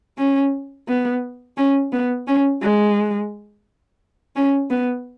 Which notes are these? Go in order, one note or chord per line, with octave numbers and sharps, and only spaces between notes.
C#4
B3
C#4
B3
C#4
G#3
C#4
B3